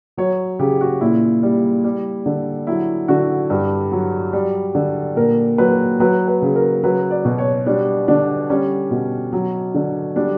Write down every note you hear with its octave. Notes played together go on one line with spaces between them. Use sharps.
F#3 C#5
C#3 G4
F#4
A#2 E4
G3
G3
D3
F#3 E4
D3 F#4
G2 G4
F#3
G3
D3
A#2 A#4
F#3 B4
F#3 B4
B4
C#3
A#4
F#3 B4
D5
B2
C#5
G3 D4
D3 D4
G3 C#4
B2
F#3
D3
G3 D4